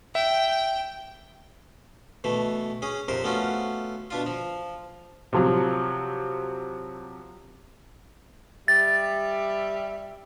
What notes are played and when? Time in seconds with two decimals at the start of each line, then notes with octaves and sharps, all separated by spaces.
0.15 E5 G5
2.24 B2 E3 A3
2.82 C#4 G#4
3.08 F2 C3 A#4 C5
3.24 A3 B3 C#4 F4 F#4
4.11 B2 D4 F4
4.26 F3
5.33 C3 F3 F#3
8.68 G3 E5 A6